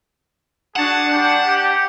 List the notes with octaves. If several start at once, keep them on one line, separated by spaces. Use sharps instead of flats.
D4 F#4 G#4 F#5 A5
G3 D4 G6
G4